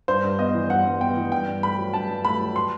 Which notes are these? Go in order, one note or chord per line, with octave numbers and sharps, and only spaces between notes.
G2 C5
G2
B3 D#5
E3
G2 F#5
G2
B3 G5
E3
G2 G5
G2
A3 B5
F#3
G2 A5
G2
A3 B5
F#3
C6